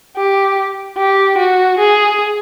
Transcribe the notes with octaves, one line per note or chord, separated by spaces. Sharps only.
G4
G4
F#4
G#4